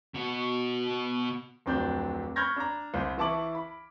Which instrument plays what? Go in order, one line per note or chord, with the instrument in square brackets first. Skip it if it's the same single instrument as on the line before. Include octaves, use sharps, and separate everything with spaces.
[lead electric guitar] B2 F#4
[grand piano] D1 F2 F#3 C4 D4 G6
B5 C#6 F6 G6 G#6 A#6
D4 A#5
C2 C5
E3 E4 A5 C#6 D6 F#7
B5